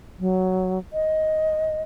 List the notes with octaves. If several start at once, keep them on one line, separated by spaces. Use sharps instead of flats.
F#3
D#5